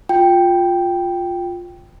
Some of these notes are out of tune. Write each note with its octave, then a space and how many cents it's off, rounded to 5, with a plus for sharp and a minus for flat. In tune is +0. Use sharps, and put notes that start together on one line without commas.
F4 +15 G5 +0